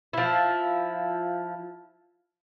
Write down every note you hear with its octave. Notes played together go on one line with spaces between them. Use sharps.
F3 E4